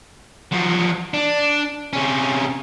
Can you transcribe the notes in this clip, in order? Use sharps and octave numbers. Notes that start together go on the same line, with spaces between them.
F3 F#3
D4
C3 C#4